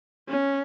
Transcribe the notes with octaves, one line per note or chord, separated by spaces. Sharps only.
C#4